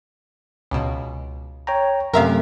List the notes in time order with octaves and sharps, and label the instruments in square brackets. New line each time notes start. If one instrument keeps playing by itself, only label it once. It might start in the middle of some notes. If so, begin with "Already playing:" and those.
[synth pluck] C#2 B2
[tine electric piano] C#5 G5 A#5
[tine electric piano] F#2 C3 A3 [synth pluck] A#4 E5 F5